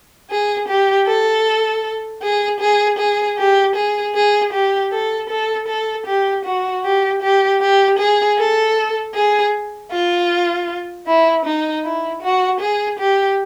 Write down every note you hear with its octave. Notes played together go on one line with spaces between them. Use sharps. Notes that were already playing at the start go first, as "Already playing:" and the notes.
G#4
G4
A4
G#4
G#4
G#4
G4
G#4
G#4
G4
A4
A4
A4
G4
F#4
G4
G4
G4
G#4
A4
G#4
F4
E4
D#4
E4
F#4
G#4
G4